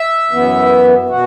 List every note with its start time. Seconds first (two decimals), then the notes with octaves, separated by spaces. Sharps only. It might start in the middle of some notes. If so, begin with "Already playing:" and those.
Already playing: E5
0.31 F#2 E3 B3
1.09 B2 F#4